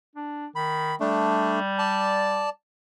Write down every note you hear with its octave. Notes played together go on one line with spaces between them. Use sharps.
D4
D#3 B5
G3 A3 D4
D5 A5